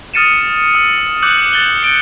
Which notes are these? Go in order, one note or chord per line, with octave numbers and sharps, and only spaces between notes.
D#6 F6 A6 C#7 D#7 E7
E6
D6 E6 F#6 G6 C#7 F#7
G6 A6 F#7 G7
C#7 D7